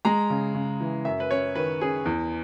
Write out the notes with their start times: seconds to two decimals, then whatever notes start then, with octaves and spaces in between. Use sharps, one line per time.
0.05 G#3 A#5
0.30 C#3
0.55 C#3
0.80 E3
1.05 F#2 E5
1.20 B4
1.31 C#4 C#5
1.56 D#3 B4
1.81 C#4 G#4
2.06 E2